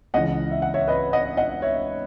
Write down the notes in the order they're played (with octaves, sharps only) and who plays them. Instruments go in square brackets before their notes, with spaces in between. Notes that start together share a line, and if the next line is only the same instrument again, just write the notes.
[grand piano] C#2 C#3 E3 D#5 F#5
E5
F#5
C#5 E5
B4 D#5
D#5 F#5
D#5 F#5
C#5 E5